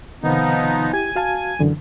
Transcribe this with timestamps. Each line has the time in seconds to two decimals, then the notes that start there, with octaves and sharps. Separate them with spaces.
0.24 C3 D#3 F3 B3 D#4
0.93 E4 G4 G#5 G#6
1.16 F#4 F5 A5
1.59 F#2 D3 E3